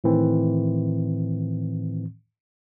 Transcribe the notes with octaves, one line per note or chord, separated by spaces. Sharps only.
A2 D#3 E3 C4